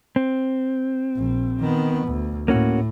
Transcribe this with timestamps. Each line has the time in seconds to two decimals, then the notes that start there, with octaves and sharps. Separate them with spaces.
0.16 C4
1.16 A#1
1.60 D#3 B3
2.07 D2
2.48 A2 A#3 C#4 F#4